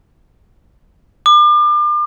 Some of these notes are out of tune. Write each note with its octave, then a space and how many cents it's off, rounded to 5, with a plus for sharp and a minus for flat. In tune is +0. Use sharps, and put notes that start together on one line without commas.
D6 +35